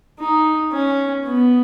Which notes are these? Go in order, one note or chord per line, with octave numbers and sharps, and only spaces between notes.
D#4
C#4
B3